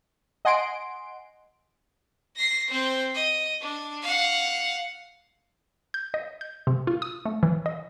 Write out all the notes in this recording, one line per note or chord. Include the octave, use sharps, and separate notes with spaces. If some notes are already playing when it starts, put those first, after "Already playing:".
D#5 F#5 G#5 C6 D7
A#6 C7
C4 C5
D#5
D4
F5 F#5
G6
D#5
G6
C3
F4
D#6
A3
E3
D#5